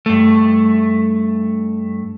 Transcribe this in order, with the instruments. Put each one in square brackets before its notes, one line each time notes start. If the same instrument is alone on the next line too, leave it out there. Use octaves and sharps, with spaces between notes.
[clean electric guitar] G2 A3